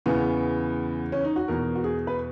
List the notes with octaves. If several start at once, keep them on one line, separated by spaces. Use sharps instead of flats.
E2 C#3 E3 B3
C#4
D#4
F#4
E2 B2 A#4
F#4
G#4
B4